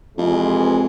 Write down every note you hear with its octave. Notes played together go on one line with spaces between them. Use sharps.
F2 C3 E3 G#3